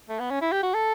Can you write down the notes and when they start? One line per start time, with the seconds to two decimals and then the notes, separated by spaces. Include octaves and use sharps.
0.09 A3
0.20 B3
0.31 C#4
0.42 E4
0.52 G4
0.63 F#4
0.74 A4